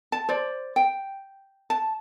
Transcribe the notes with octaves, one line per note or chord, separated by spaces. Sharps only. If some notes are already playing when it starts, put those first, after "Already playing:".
A5
C5 D5
G5
A5